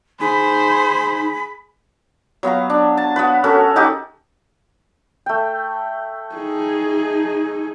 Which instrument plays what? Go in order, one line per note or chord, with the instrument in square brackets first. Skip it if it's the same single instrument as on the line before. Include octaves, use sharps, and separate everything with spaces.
[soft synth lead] D#4 [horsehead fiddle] G#4 [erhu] C5 [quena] B5
[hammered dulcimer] F#3 B3 F5 A#5
D4
A5
B3 F#4 B4
C#4 F#4 A4 A#4
D#4 F#4 G4
[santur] A3 G5
[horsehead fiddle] D#4 G#4